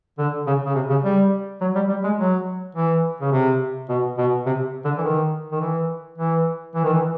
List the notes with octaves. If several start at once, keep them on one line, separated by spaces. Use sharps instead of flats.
D3
C#3
C#3
C3
C#3
G3
F#3
G3
G3
G#3
F#3
E3
C#3
C3
B2
B2
C3
D3
E3
D#3
D#3
E3
E3
E3
D#3
E3